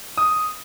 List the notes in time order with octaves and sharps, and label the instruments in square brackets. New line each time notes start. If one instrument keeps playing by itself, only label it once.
[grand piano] D#6